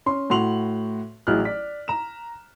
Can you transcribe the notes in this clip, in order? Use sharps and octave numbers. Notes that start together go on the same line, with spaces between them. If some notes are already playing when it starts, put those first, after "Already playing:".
C#4 C6
A2 F#4 C6 F7 F#7
A1 F#3 E4 G#4 F6 F#6
D5 B6
A#5 E7